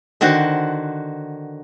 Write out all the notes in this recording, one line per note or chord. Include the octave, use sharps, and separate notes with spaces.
D3 D#3 F#4 C5 F#5